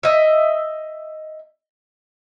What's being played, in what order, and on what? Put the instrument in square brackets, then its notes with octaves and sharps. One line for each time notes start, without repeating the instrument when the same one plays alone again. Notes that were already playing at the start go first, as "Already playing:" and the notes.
[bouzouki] D#5 E5